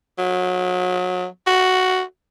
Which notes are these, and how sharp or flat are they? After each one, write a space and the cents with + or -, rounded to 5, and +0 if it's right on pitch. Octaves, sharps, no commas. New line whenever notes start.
F#3 -30
F#4 +5